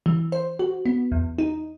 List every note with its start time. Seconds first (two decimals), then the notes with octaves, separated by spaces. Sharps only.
0.06 E3
0.32 C5
0.59 F#4
0.86 B3
1.12 E2
1.38 D#4